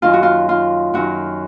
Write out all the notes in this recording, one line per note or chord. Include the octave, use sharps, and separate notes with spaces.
F#2 D#3 F4
F#4
F4
F4
F#2 D#3 F#4